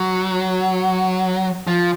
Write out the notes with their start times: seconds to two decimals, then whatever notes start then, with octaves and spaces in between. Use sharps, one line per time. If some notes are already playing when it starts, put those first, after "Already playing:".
Already playing: F#3
1.67 F3